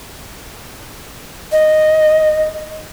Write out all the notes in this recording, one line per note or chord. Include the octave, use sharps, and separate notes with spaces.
D#5